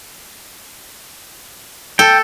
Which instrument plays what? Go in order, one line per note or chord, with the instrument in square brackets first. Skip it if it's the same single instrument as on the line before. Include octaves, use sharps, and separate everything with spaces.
[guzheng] A4 [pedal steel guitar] G5